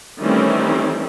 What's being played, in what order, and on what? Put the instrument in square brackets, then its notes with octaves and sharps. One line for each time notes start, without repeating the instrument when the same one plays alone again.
[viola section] D#3 E3 G3 A3 C4 C#4